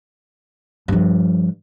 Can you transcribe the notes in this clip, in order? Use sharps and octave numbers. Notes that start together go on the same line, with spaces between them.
G2 F3